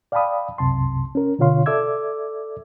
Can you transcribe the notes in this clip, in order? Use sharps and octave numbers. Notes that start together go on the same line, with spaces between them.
D5 F5 G5 A5 B5 D#6
C2 F#2 C3 A5 C6
C#4 A#4
B2 D3 F4 C#5 F5 C6
A4 D5 E5 D6 E6 G#6